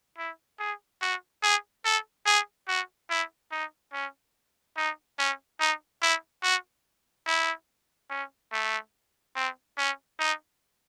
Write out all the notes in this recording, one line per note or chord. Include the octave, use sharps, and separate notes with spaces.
E4
G#4
F#4
G#4
A4
G#4
F#4
E4
D#4
C#4
D#4
C#4
D#4
E4
F#4
E4
C#4
A3
C4
C#4
D#4